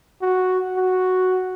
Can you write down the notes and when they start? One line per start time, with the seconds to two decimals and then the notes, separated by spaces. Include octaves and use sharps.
0.22 F#4
0.77 F#4